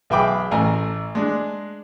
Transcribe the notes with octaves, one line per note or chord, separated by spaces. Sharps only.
B1 G#4 E5 G5 B5 D6
A1 A3 G#5 A#5
G#3 D4